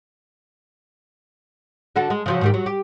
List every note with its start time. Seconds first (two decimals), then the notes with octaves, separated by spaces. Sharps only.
1.96 D3 F#4 A4
2.10 G#3
2.26 C#3 F3 F#3
2.41 G#2 D#3 G4
2.54 F#3
2.66 G4